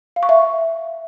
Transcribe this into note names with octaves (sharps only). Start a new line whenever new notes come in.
F5
C#6
E5